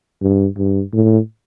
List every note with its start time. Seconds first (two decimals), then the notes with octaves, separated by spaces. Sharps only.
0.22 G2
0.57 G2
0.93 A2